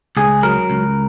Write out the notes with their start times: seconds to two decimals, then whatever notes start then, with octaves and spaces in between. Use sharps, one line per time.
0.17 C#2 G#4
0.43 F#3 A#4
0.70 C#2